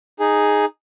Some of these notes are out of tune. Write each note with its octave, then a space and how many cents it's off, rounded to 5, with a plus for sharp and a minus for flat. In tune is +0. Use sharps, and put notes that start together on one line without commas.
D#4 +0 G#4 +0